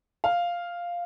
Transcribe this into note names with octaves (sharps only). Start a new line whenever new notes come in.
F5